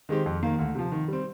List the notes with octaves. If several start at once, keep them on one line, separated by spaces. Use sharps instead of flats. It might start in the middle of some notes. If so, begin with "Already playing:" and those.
D#3 G#3 C4 G4
F2
D#3 A#3
D2
C3 F3
D#3
G3 C4